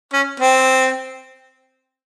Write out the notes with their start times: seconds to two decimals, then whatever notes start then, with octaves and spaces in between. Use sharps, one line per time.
0.13 C#4
0.40 C4